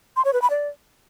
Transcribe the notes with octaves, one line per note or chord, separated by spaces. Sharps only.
C6
C#5
B4
B5
D5